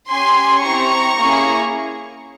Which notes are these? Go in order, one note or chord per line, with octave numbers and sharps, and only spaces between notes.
C#4 G4 G#5 C6
C4 E4 G4 A#5 C#6
A#3 C#4 E4 G#4